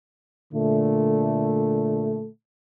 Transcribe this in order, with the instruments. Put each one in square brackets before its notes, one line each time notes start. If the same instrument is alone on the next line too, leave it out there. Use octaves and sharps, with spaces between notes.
[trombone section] A#2 D3 A3